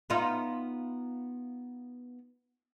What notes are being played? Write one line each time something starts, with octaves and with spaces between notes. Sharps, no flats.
B3 D#4 F4